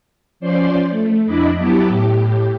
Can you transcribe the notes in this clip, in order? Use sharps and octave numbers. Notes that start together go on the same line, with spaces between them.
F3 C#4 C5 D5 C6
A3
F2 D4 E4 D#5 B5 D6
F#3 B3 E4 G4 A5 D6
A2 G4